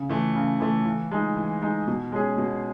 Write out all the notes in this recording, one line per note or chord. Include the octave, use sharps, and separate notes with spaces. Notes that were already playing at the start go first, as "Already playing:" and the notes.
Already playing: C#3
E3 A3
C#3
E3 A3
E3
G#3 D#4
E3
G#3 D#4
B2
G#3 C#4 G#4
B2